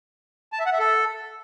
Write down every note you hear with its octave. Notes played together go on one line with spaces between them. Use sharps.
A5
E5
F#5
E5
A4